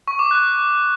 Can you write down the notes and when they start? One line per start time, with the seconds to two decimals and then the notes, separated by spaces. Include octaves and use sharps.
0.08 C#6
0.19 D6
0.31 F#6